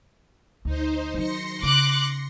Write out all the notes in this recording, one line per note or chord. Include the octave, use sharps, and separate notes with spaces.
D2 D#4 C5
D#3 F#3 C6 A#6 C#7
C#3 D6 F#6